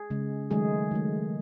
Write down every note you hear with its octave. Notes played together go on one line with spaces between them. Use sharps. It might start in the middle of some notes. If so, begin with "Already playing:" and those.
Already playing: G#4
C#3 G#3
D#3 F#3 G#3 A3 G#4
D#3 F#3 A3